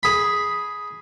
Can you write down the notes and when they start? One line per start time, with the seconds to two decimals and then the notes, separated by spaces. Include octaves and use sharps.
0.03 G#4 B5